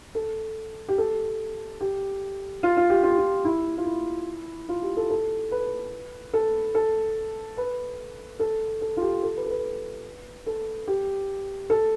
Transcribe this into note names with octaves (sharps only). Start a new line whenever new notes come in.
A4
G4
A4
G4
F4
F4
G4
F4
G4
F4
E4
F4
E4
F4
G4
A4
A4
B4
A4
A4
B4
A4
A4
F4
G4
A4
B4
A4
B4
A4
G4
A4